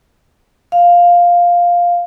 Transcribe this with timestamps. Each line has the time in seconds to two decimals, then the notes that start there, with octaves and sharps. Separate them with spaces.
0.72 F5